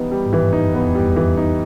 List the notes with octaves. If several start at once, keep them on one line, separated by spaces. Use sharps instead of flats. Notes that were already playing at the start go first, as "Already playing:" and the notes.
Already playing: E3 G3 B3 D#4
G3
G#2
G2 E3
F#2 D#4
F2
B3
E2
F#2 G3
F2
E2
F2 E3
D#4